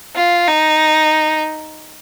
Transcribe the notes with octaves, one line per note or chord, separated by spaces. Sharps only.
F4
D#4